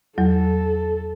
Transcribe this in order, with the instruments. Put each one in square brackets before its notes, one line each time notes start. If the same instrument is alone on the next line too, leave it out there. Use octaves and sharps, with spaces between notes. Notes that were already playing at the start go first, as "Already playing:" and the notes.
[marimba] E2 F#3 [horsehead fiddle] A4